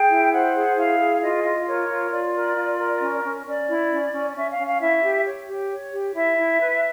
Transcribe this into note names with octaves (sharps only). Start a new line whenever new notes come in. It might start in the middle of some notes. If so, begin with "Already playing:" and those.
Already playing: G#4 G5
E4
C5 F#5
G#4
E4 F5
G#4
F4 D#5
F4
A#4 C#5
F4
F4 D5
A#4
F4
A#4
C#4
C#4
C#4 D5
E4
C#4
C#4
C#4 E5
F5
C#4
F5
E4 E5
G4
C#5
G4
C#5
G4
E4 E5
E4
B4